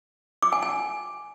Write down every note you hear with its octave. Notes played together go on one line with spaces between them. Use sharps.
D6
G#5
G#5